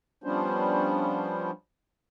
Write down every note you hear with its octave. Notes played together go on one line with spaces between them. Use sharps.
F3 G3 B3 C#4 D4 C5